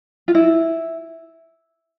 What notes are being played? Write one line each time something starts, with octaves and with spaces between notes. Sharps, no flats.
F4
E4